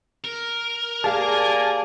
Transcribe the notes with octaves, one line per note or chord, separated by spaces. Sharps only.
A#4
A#3 G4 G#4 D5 F5 G#5 A5